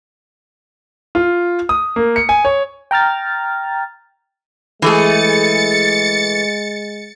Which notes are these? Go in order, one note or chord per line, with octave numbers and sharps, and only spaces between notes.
F4
D#6
A#3
C#7
G#5
C#5
G5 A#5 F6 A6
E3 G#3 A3 G#4 A6 C#7